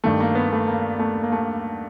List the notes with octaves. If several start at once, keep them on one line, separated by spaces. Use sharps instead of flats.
G2 D#3 A3
A#3
B3
A3
A#3
A3
A#3
A3